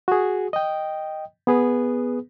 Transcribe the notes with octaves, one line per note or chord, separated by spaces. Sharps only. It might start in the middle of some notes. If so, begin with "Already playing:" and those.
F#4 G#4
D#5 G5
B3 G#4 B4